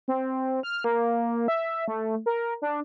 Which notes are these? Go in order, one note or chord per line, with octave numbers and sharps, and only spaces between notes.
C4
F6
A#3
E5
A3
A#4
D4